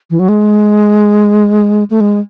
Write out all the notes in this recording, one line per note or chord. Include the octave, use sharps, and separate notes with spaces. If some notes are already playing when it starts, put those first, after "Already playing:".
E3
F#3
G#3
A3
G#3